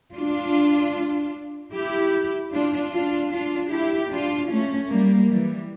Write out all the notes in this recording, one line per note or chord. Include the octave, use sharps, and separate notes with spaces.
D4 F4
E4 G4
D4 F4
D4 F4
D4 F4
E4 G4
D4 F4
A3 C#4
G3 A#3
E3 G3